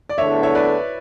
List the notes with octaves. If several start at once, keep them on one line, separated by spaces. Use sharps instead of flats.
D5
E2 D3 A3 C#5 E5
C#5 E5
B4 D5